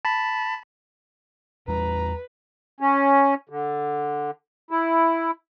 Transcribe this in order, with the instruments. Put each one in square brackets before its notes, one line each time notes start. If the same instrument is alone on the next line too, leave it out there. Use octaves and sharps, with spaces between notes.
[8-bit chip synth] A5 B5
[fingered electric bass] E2 G3 [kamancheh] B4 [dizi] A#5
[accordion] C#4
D3
E4